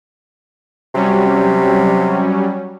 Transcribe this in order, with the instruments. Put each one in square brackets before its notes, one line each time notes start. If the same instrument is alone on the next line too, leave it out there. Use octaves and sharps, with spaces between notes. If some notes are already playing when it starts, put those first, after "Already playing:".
[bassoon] C3 [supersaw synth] F#3 G3 C#4